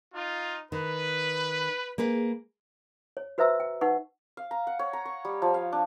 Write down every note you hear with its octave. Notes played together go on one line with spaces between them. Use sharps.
D#4 F4
D#3 B4
A#3 G#4 B4
C#5
F#4 B4 C5 E5 A#5 E6
G5
D#4 B4 F#5 C#6
F5
A#5
F#5
C#5
A#5
C#6
G3
F3
F5
D4